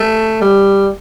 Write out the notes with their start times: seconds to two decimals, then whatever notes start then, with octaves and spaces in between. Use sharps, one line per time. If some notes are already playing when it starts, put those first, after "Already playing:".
Already playing: A3
0.41 G3